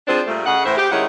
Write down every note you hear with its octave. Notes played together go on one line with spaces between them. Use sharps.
F3 C4 D4 G#4 C5
A#2 G3 A3
C#3 D#5 F#5
A2 E3 E4 C5
G4
D#3 G#3 C#4 E4 F#5